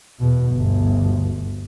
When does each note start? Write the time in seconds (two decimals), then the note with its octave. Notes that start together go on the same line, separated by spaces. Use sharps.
0.20 E2 B2
0.53 G1 D2